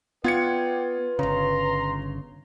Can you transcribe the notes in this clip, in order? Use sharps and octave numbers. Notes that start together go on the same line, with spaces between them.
B3 F4 B4 D5 F#5 G5 G#6 C#7
G1 C#3 A#5 C6